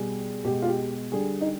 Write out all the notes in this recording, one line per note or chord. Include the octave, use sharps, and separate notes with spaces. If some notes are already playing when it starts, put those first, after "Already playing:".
Already playing: B2 G3 G#4
B2 G#3 G4
F4
G4
D3 G3 G#4
D#4